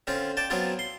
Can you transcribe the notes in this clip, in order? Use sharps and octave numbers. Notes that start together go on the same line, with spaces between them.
D3 C4 C#4 F4
D5 G5 A5
F#3 B3 C4 D4 E4 F4
C6